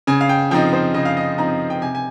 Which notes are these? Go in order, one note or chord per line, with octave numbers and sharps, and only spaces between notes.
C#3 G#5
F5
G5
F3 C4 D#4 G5
C5
C#3 D#5
F5
D#5
F3 C4 D#4 A#5
G5
C3 G#5
G#5